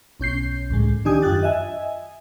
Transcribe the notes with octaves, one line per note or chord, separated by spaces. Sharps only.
B1 C#4 G6 C7
C#2 A2 G#3
D#3 D4 D#4 G4 G#5 D#6
F#2 F4 G4 F#6 A6
D#5 E5 G#5